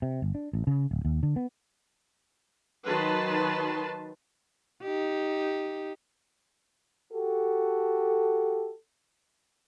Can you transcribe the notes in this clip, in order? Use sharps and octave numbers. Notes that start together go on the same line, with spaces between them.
C3
G1
D4
A1
C#3
D1
D#2
D3
B3
D#3 F#3 B4 A5 C6
D#4 G4
F#4 G4 A4